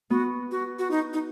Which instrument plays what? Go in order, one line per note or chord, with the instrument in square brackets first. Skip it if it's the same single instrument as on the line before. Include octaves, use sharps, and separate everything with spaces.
[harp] B3 [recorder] F#4
[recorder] F#4
F#4
D#4
D#4